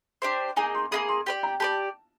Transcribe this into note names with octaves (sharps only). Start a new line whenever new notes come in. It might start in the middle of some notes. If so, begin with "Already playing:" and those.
D4 G4 C5
A#3 D#4 G#4 G#5
C6
A#3 D#4 G#4 B5
C6
G4 B4 D5
A#5
G4 B4 D5 A5